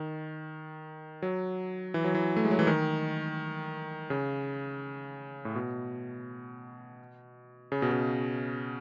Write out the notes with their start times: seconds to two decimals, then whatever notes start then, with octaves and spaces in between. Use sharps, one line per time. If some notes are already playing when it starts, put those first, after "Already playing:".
Already playing: D#3
1.22 F#3
1.94 E3
2.04 F#3
2.15 E3
2.36 A3
2.45 G#3
2.51 F#3
2.59 E3
2.67 D#3
4.10 C#3
5.45 A2
5.55 B2
7.72 C#3
7.82 B2
7.92 C#3